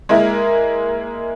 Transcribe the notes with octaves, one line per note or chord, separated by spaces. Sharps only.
G#3 A#3 E4 A#4